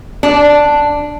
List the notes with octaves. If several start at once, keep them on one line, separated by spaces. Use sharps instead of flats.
D4